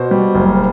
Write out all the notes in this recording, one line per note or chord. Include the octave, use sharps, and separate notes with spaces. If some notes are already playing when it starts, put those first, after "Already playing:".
Already playing: B2 C5
G3
F#1